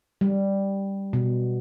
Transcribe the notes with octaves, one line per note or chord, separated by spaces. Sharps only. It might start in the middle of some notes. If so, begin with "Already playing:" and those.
G3
B2